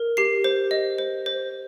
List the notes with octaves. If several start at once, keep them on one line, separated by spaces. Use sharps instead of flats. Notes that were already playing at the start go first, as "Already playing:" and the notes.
Already playing: A#4
G4 C7
C5
D#5
C5
C5